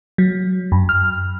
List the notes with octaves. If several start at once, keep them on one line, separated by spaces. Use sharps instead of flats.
F#3
F#2
F6